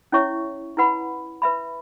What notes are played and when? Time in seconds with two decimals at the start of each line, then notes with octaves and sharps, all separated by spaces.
0.12 C#4 E4 C#5 E5 C#6
0.77 E4 B4 F#5 B5
1.42 B4 E5 B5